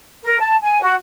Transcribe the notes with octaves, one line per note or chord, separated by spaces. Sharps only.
A#4
A5
G#5
F#4